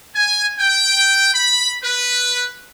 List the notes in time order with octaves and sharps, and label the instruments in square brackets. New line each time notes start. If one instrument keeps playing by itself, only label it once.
[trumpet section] G#5
G5
B5
B4